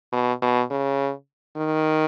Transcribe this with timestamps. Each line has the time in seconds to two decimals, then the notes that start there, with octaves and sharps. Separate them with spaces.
0.12 B2
0.42 B2
0.71 C#3
1.57 D#3